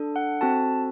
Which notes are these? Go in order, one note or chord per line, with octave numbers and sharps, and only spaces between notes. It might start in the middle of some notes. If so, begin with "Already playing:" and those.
Already playing: D4 A4
F#5
C4 F#4 A4 A5